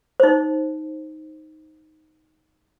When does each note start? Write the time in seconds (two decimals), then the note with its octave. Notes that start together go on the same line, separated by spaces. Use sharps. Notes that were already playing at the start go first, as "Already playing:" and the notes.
0.20 D#4 C5